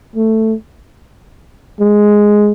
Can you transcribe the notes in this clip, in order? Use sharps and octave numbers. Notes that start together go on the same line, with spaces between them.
A3
G#3